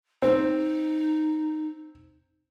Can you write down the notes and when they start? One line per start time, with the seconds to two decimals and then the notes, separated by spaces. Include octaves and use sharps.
0.22 C4 D#4